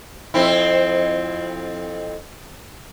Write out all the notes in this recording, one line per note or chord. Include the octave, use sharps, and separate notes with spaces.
F2 C4 E4